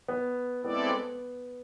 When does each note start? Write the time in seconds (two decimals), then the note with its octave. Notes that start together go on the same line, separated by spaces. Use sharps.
0.08 B3
0.64 G#3 B3 C4 E4 A4 D5